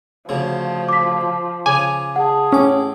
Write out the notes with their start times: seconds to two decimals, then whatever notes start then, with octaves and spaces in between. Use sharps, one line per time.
0.29 D2 C#3 F3
0.89 D6 B6
1.66 C#3 G#5 D6
2.16 G#4 F#5 A5
2.52 A1 C#4 D6